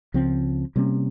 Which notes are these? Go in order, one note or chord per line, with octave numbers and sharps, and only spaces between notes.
C#2 C#3 F3 C4
C3 G3 A#3 C#4